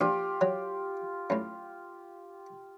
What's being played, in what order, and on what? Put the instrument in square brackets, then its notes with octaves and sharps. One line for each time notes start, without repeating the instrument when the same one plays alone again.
[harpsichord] A#1 [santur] F4 G4
[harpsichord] F#3
F#2 A2